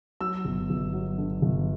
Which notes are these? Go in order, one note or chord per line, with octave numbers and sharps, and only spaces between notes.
F#3 E6
G1
G1
F#3
D3
G1